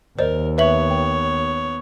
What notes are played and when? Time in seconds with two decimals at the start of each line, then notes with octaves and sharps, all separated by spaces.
0.19 D#2 A#4 C5 D5 D#5
0.58 B3 B4 C#5 E5 F#7
0.91 G5